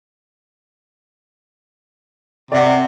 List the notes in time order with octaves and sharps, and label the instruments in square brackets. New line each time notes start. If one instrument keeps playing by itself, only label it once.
[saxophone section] C3 [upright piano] D5 F#5